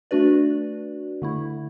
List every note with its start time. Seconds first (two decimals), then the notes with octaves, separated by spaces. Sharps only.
0.11 A3 D4 F#4 B4 D5
1.22 D3 A3 E4